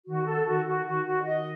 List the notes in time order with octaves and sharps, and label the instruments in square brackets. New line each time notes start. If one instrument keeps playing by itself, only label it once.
[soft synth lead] D#3 [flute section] F#4
[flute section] A4
[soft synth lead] D#3 [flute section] F#4
[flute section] F#4
[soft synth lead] D#3 [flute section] F#4
[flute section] F#4
D#5